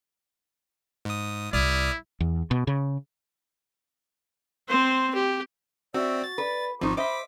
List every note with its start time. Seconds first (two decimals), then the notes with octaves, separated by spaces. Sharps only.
1.05 G#2 D#6
1.53 C2 E4 D5 D#6 F6
2.20 E2
2.51 B2
2.67 C#3
4.69 C4 C5
5.15 G4
5.94 C4 F#4 D5 E5 E6
6.24 A6
6.38 B4 D5
6.81 G#1 F3 C4 D#4 C#6 D6
6.97 C5 D#5 E5 B5 D6 B6